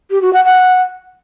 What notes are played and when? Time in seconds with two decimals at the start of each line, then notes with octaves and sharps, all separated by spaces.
0.11 G4
0.22 F#4
0.33 F#5
0.45 F#5